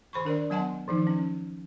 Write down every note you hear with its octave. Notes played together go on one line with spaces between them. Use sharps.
D#3 C5 B5 C#6
D4 A#4 C5 D5
F#3 B3 D#5 F#5 A5 C6
D#3 F3 D#4
C#4